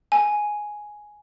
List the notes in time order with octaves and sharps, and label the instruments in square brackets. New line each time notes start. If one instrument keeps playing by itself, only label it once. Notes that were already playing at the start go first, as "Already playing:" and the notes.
[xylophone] G#5